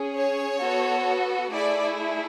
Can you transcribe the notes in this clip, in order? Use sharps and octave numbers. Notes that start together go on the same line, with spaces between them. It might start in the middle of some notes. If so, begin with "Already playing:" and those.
Already playing: C#4 G#4
C#5
B3 F#4 A4
A3 E4 G#4 D5